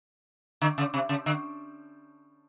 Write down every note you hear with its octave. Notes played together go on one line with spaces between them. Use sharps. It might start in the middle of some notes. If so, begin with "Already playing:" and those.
D3
C#3
C3
C#3
D3